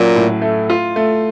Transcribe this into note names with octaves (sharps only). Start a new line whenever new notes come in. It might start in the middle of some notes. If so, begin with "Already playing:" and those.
Already playing: A#2 F#3 C#4
A2
A3
F4
A3